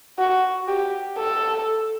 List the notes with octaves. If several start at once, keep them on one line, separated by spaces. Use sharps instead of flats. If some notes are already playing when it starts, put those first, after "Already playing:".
F#4
G4
A4